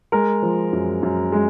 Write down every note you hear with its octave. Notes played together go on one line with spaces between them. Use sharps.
G#3 A#4
F3
F#2
F#2
G#3